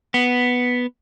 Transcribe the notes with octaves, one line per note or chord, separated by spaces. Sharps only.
B3